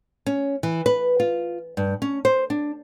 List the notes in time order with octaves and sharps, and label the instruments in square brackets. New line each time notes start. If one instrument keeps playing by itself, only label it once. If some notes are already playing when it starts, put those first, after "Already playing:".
[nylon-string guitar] C#4
E3
B4
F4
G2
C#4
C5
D4